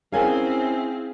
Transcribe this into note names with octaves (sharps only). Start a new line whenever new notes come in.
C4 C#4 E4 G#4 A#4 C#5 F5 G#5